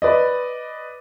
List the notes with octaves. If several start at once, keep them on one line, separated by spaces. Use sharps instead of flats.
B4 D5 D#5